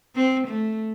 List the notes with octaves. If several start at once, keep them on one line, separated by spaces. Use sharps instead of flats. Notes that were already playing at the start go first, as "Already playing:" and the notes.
C4
A3